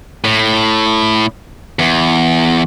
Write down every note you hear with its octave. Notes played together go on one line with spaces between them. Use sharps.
A2
E2